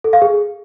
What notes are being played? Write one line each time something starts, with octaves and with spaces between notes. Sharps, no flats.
A4
F5
G#4